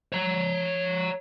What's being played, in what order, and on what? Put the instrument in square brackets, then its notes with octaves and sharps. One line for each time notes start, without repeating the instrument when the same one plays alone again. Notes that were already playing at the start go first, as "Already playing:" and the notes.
[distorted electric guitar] C#5 A#5